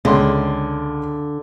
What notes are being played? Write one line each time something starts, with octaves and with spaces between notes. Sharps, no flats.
C#2 D3 C6